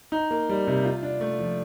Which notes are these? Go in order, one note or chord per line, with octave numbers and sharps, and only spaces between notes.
D#4
A#3
G3
C3
F4
D4
A3
F3